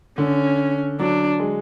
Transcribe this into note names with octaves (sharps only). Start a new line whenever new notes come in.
D3 C#4
F#3 D4
G#3